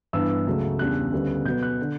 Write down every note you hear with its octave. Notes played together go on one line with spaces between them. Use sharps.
G2 E3 B3 D4 E6
C#2 C#3 F#3 A3
E2 C#3 G3 D4 F#6
D2 C#3 G3 B3
B2 F#3 B3 G6
F#6
D3